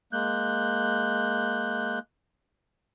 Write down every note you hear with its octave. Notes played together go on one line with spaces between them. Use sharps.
G#3 A#3 F#6 G6